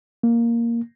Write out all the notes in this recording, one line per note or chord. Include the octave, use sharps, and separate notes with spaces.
A#3